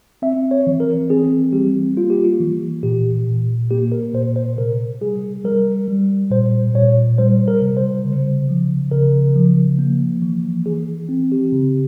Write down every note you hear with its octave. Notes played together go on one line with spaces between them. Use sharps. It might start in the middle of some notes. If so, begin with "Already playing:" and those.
C4 E5
C#5
E3
A#4
C4 G#4
G3 G4
A#3 F4
G4
F4
E3
A#2 G4
A#2
A#3 G4
A#4
A#2 C5
C5
C3 A#4
G3 G#4
G3 A#4
G3
A#2 C5
A#2 C#5
G3 C5
A#4
C3
C5
C#3
F3
C#3 A#4
F3
A#3
E3
E3 G#4
C4
G4
C#3